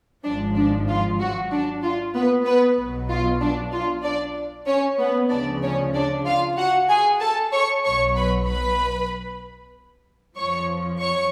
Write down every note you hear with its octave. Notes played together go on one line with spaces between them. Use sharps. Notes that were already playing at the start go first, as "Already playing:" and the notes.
G#1 G#2 F3 D4
D4
F4
F#3 F#4
D4
F4
B3 B4
B3 B4
B1 B2 F#3
F4
D4
F4
D4 D5
C#4 C#5
B3 B4
D2 C#3 F3 D4 D5
C#4 C#5
D4 D5
F4 F5
F#4 F#5
G#4 G#5
A4 A5
C#5 C#6
B1 B2 F#3 C#5 C#6
B4 B5
B4 B5
F2 F3 C#5 C#6
C#5 C#6